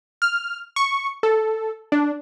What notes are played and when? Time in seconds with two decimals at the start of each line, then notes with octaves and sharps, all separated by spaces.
0.22 F6
0.76 C#6
1.23 A4
1.92 D4